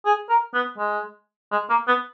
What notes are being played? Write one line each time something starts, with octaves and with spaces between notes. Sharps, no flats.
G#4
A#4
B3
G#3
G#3
A#3
B3